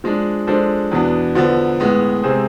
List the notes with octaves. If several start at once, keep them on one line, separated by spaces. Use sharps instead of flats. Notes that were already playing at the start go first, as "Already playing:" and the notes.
F3 G#3 D4
F3 G#3 D4 A4 C5
E2 B2 B3 D4
D3 F3 B3
A2 G#3 B3
C3 G#3 C4 G#4 C5